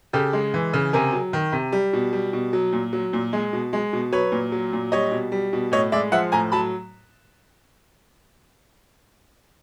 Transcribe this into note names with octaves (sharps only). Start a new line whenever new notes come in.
C#3 G4 A4
G#3
E3
C#3
C3 G#4 A#4
F#3
D#3
C3
G3
B2
G3
B2
F#3
A#2
F#3
A#2
G#3
B2
G#3
B2
F#3 B4 C#5
A#2
F#3
A#2
G3 C#5 D#5
B2
G3
B2
A2 C#5 D#5
G#3 D5 E5
F3 E5 F#5
A2 G#5 A#5
F#3 A5 B5